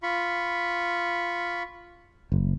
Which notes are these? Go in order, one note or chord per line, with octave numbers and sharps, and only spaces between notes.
F4 B5 C#6
F#1